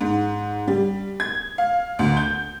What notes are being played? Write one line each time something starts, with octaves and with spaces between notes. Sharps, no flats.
G#2
G3
G#6
F5
D2
G6